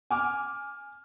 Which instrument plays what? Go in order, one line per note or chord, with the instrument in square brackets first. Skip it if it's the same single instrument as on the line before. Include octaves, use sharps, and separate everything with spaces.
[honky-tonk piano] G#5 D6 F6